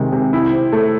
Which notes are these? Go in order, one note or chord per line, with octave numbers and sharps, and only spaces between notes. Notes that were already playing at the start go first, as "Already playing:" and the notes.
Already playing: C3 D#3 G#3
C3
E4
C4
A3